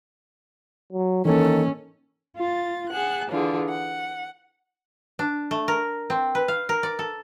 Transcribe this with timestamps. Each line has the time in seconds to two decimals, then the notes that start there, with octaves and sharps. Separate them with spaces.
0.93 F#3
1.25 D#3 E3 A#3 C#4 A4
2.36 F4 A6
2.90 G#4 F#5 A5 F#6
3.31 D3 E3 F4 G#4
3.70 F#5
5.19 D4
5.51 A3
5.68 A#4
6.10 C4
6.35 B4
6.48 F5
6.69 A#4
6.83 D5
6.99 A4